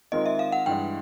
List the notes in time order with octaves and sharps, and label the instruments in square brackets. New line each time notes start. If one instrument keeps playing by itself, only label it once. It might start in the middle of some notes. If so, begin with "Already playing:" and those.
[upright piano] D#3 G#3 C4 F4 A#4 [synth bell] D#5
[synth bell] E5
F5
F#5
[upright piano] G2 E3 G#3 [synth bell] G5